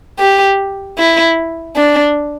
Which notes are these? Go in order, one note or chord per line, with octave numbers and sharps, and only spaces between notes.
G4
E4
D4